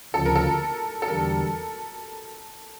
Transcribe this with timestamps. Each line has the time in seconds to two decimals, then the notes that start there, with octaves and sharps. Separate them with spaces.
0.14 D2 C#3 F3 A4
0.25 A#4
0.35 A4
1.02 A4
1.08 E2 D3 G3 A#4